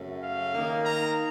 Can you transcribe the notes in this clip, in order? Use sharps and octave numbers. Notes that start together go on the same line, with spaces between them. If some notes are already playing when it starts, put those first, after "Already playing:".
Already playing: F#2 C#3 A3 C#4
F5
D#3 A#3 D#4
A#5